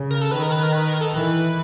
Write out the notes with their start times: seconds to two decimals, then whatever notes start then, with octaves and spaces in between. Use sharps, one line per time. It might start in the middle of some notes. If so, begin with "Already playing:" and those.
Already playing: C#3
0.11 A#4
0.21 A4
0.31 D#3 B4
0.42 A#4
0.52 B4
0.63 A#4
0.73 B4
0.87 A#4
1.01 A4
1.15 E3 B4